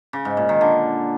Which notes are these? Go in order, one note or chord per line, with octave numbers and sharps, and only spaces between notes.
C#3
G#2
A#2
D#3
D3